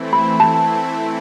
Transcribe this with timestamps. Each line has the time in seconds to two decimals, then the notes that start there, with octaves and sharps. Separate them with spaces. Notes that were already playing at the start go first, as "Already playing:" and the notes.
Already playing: E3 A3 C4 E4
0.13 B5
0.40 A5